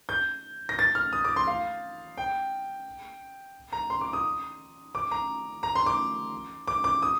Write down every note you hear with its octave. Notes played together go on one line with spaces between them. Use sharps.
G6
A#6
A6
F6
D#6
D6
C6
F5
G5
A#5
C6
D6
D#6
D6
A#5
A#5
C6
D6
D6
D6
D#6